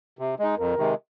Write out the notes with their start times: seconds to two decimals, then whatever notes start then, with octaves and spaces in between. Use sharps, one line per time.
0.19 C3
0.39 G#3 D#4
0.58 F2 A#4
0.78 C3 D#3 G#3